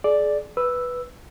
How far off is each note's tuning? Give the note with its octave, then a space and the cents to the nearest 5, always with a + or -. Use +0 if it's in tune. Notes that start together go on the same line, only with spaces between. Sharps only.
G#4 +35 D5 +0
B4 +0 E6 +0